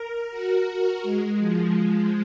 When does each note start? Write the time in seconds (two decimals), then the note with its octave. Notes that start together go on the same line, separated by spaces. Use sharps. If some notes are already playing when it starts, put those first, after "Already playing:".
Already playing: A#4
0.30 F#4
1.03 G#3
1.39 F3
1.75 F3